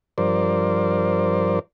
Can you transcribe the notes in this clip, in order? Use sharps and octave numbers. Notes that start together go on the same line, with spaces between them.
G2 F3 A#4 C5 D5